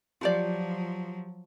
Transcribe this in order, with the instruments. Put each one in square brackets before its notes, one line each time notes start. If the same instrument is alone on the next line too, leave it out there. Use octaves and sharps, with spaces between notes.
[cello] F3 F#3 [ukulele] F4 G4 D5